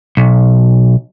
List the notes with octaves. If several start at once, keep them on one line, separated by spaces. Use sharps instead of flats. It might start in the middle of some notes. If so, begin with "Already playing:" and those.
B1